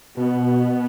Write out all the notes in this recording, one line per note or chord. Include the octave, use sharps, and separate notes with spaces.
B2 B3